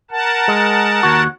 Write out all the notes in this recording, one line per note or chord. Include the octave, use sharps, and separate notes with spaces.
A#4 F#5 A5
G#3
D#2 F#4